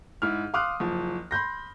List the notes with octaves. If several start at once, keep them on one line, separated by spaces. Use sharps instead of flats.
G#2 E4 F6
F5 C6 D6 D#6 F6 F#6
F#1 F3
B5 C6 G6 A#6